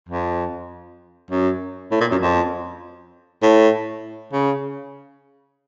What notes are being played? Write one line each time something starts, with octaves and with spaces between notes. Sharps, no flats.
F2
F#2
A2
A#2
F#2
F2
A2
C#3